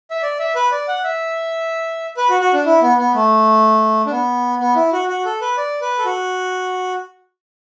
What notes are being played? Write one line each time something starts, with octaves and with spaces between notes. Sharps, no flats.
E5
D5
E5
B4
D5
F#5
E5
B4
F#4
F#4
D4
E4
B3
B3
A3
D4
B3
B3
E4
F#4
F#4
A4
B4
D5
B4
A4
F#4